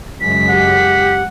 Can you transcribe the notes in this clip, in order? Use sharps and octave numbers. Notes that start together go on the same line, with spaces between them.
F#2 C#3 G#3 B6
G4 F#5